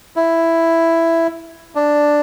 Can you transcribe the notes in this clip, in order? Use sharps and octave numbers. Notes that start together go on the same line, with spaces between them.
E4
D4